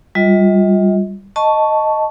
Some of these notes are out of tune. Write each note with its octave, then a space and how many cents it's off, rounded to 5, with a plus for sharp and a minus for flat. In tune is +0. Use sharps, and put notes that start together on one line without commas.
G3 +0 F4 +20 D#5 +45
D#5 +0 A5 +0 C#6 +5